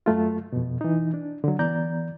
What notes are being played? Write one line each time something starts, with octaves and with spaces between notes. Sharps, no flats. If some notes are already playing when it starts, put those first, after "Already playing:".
F#2 F#3 A3 F4
F2 B2
E3 D#4
D4
D3 F#3
E3 B3 D5 A#5 G6